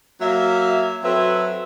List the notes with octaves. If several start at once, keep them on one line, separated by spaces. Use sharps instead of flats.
F#3 A#3 E5
F#3 C4 A4 B4 E5